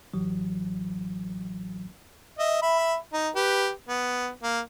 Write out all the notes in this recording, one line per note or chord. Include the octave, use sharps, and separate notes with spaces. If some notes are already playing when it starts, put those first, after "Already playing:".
A1 A2 E3 F#3
D#5 E5
E5 B5
D#4
G4 B4
B3
A#3